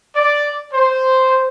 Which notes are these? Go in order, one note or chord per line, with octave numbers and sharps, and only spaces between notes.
D5
C5